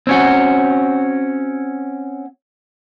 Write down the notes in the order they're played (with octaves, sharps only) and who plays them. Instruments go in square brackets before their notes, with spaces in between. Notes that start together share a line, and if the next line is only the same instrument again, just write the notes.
[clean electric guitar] C4 C#4 F#4